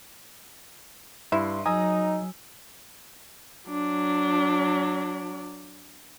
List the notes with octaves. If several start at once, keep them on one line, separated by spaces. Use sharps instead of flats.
G2 E4 C6
F#3 D#4 G#4 A#5 E6
F#3 D4